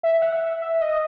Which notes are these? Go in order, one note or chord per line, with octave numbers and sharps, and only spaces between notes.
E5
F#5
E5
E5
D#5